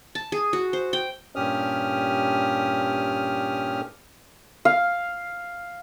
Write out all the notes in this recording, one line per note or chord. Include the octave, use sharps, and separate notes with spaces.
A5
G#4
F#4
C5
G5
G2 A#2 C#4 G4 D#6 F6
F5